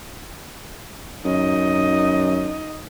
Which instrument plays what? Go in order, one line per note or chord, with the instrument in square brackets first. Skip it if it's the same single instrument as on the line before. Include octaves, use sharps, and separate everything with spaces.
[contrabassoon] F#2 [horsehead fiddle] D#4 D#5